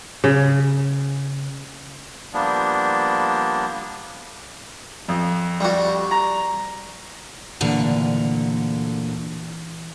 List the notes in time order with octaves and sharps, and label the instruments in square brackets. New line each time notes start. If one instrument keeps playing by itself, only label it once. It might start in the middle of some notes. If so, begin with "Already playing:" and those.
[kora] C#3
[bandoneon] F3 G3 A#3 B3 D4
[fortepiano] F2
[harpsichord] G3 F#4
[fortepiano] A#5
[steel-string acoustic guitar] D2 A#2 D3 [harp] E3